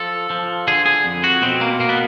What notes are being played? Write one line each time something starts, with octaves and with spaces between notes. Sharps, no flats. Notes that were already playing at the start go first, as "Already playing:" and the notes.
Already playing: F3 A4
F3
D3 G#4
G#4
F2
F#4
B2 C4
A#3
B2 A#3
B3